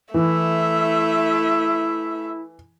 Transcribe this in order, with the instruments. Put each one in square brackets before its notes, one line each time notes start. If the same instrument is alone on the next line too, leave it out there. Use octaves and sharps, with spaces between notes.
[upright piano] E3 [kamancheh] A3 E5 [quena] E4